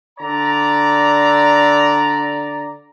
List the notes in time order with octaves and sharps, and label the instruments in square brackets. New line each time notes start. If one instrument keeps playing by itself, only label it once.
[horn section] D3 D5 A#5